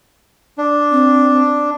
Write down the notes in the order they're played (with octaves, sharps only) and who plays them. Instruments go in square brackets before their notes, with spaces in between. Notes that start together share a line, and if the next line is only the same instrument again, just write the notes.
[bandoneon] D4
[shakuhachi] C4